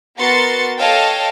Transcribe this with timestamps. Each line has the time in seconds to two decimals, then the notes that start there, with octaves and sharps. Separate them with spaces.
0.17 B3 F#4 A#4 C6 A6 C#7
0.77 A4 C#5 D#5 F5 G5 A5